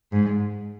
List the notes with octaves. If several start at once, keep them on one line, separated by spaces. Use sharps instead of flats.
G#2